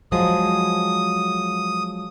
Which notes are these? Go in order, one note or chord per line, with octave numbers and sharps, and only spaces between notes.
F3 F#3 G#3 D#6